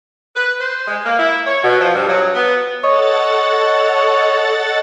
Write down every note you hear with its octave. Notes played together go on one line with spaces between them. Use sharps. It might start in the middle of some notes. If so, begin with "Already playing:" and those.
B4
C5
G#3
A#3
E4
C#5
B2
F3
G2
F#3
B3
A4 C#5 D#5 F#5 A6